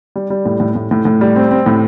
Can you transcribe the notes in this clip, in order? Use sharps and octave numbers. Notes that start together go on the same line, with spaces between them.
G3
G3
A2
A2
A2
A2
A2
G3
C4
C4
A2